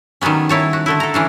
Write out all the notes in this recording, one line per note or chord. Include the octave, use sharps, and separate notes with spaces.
D#3 F#3 G3 B3 C#4
D#3 E4 C#5 A5
F#4
D3 A3 E4
A4 A#5
E3 C#4 D4